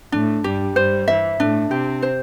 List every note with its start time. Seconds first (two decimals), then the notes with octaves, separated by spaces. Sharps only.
0.12 A2 A3 D4
0.44 G2 G3 G4
0.75 G2 G3 C5
1.08 E3 E5
1.39 A2 A3 D4
1.70 C3 C4 G4
2.02 C5